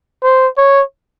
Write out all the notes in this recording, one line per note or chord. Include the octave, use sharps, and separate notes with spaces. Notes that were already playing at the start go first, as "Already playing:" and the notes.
C5
C#5